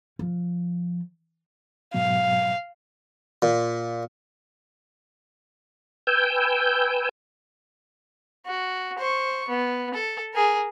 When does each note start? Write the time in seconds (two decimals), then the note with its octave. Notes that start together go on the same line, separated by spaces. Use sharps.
0.19 F3
1.94 G#2 B2 F#3 F5
3.42 A#2
6.07 B4 G5 G#5 E6 G6
8.46 F#4
8.98 C5 C#6
9.49 B3
9.94 A4
10.34 G#4 A#4